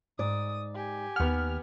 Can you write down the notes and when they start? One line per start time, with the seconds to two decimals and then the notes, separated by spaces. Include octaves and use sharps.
0.19 G#2 D5 D#6
0.75 G4 G#5
1.16 D#2 B3 F#5 F6